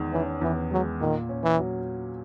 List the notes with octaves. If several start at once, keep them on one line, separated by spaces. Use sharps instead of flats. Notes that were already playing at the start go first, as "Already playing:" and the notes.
Already playing: E2 D#3 G#3
E3 C#4
E2 E3
F#3 G#3
A#2 D#3
C#4
E3
F#3